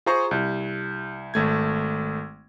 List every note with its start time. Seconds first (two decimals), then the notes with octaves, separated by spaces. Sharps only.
0.06 F4 G#4 C5 A#5 C#6
0.31 C2
1.34 G#1 A3 G#6